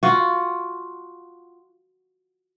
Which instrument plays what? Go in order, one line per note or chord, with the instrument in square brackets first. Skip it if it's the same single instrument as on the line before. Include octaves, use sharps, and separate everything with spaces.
[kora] F4 F#4